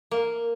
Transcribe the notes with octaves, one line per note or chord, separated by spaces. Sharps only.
A#3